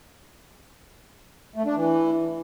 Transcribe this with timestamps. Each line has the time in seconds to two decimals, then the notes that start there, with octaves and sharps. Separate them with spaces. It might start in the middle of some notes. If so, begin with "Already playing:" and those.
1.56 A3
1.66 D4
1.76 E3